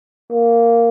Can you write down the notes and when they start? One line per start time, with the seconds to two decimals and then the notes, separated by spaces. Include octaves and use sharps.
0.31 A#3